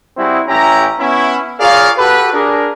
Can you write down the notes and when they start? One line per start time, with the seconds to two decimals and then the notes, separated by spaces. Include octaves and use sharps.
0.17 G3 C4 E4 F#4 G#4
0.47 A1 C#4 E4 G4 A#5
0.98 B3 C#4 E4
1.60 F4 G#4 A#4 C#5 D5 F5
1.97 F#4 G4 A4 B4
2.33 D4 G#4 A#4